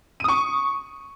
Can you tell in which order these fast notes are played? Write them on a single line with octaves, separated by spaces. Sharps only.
D#7 D#6 C#6